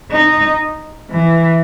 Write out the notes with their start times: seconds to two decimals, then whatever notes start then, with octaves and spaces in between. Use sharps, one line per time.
0.11 D#4
1.11 E3